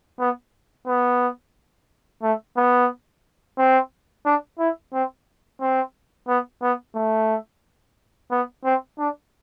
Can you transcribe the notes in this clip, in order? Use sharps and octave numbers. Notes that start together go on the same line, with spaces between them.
B3
B3
A3
B3
C4
D4
E4
C4
C4
B3
B3
A3
B3
C4
D4